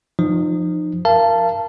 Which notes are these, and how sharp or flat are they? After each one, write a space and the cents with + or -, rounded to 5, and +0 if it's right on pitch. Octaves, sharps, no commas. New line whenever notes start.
F3 +0 D#4 -30
A#4 +0 F5 -30 A5 +0